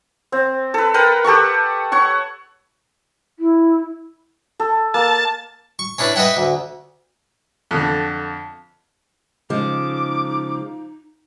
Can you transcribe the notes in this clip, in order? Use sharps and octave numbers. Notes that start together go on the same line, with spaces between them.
C4
A4 B4
A#4 B4 F#5 G5
G4 A4 F#5 C#6
C#5 F#5 C#6
E4
A4
A#3 A5
C#6
C#4 D4 E4 B4 D5
B4 D#5 E5 F#5 G5
D2
F2 D3
C#3 F3 G#3 D#4 D6